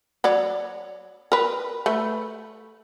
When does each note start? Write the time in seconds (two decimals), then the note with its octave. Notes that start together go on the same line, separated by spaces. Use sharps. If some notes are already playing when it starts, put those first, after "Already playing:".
0.24 F#3 C#5 D5
1.32 A#4 B4
1.86 A3 B4